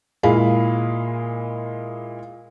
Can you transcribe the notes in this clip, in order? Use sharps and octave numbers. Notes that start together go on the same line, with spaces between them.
A#2 G#3 E4 G#4 F5 B5